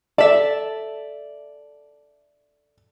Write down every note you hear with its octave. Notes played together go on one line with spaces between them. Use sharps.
A4 D5 E5